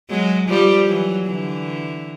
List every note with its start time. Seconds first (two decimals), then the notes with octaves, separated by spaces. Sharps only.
0.09 F#3 G#3
0.48 F3 G3
0.87 E3 F#3
1.26 D3 E3